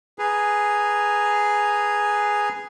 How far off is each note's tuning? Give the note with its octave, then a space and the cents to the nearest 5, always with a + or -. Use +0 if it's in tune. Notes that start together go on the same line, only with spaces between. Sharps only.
G#4 +0 B4 +0 A#5 -5